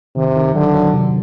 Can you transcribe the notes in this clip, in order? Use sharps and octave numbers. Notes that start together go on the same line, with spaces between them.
C3 D#3
D#3
D3 F#3
F#3
C3